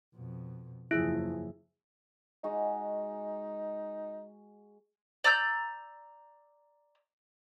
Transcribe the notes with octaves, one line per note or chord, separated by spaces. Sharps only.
F2 B2
F#1 E2 F3 E4 G#4 E5
G#3 D#4 F#4
D5 A#5 E6 G6